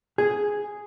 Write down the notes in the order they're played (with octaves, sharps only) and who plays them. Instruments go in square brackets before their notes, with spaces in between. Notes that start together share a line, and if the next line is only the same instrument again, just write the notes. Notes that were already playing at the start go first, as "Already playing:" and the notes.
[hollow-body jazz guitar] G#4